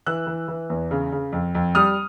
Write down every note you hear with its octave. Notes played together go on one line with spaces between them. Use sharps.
E3 E6 F#6
E3
E3
E2
C#3
C#3
F2
F2
G3 D#6 F6